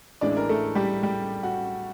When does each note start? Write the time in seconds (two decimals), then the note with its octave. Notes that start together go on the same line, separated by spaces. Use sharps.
0.21 A1 A2 E3 G#3 D4 D5
0.37 A#4
0.49 A3 A4
0.75 G3 G4
1.03 G3 G4
1.43 F#4